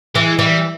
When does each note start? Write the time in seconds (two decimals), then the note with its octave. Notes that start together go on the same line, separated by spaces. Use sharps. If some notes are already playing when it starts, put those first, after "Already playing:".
0.15 E3 G#3
0.39 E3 G3